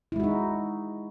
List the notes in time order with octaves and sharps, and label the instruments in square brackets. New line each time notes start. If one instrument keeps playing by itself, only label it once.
[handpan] E4
G#3
F#4
D#4